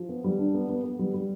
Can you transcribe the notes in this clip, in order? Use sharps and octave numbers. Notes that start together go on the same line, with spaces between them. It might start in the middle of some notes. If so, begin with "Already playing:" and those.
Already playing: F3
B3
G3
D4
B3
B3
B3
G3
G3